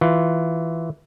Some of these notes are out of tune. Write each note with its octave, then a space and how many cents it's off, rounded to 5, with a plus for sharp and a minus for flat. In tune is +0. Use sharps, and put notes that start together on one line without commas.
E3 +0 F4 +0